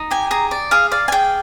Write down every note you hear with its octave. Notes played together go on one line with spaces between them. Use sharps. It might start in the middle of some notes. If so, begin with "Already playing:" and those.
Already playing: D#4
G4 G#5
G#4 A#5
D5
G#4 F5
D5 F5
G#5
G#4 G5